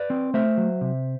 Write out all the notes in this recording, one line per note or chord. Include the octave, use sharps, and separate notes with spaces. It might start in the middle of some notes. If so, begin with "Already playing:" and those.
Already playing: B4 D5
C4
A3 C5 E5
F#3
C3